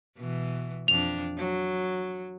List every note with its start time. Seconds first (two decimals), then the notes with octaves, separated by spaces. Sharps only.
0.17 B2 E3
0.88 F2 D4 F7
1.38 F#3